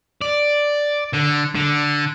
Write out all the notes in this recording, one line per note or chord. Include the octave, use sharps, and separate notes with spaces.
D5
D3
D3